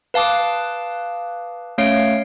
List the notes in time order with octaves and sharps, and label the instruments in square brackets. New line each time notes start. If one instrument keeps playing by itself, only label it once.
[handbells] B4 F5 A5 D6 D#6
A3 C#4 C#5 F5 D7